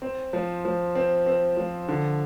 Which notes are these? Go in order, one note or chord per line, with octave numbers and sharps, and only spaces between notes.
C4
F3
F3
C4
C4
F3
D3